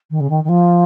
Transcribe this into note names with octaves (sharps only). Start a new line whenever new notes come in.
D#3
C#3
D#3
D#3
F3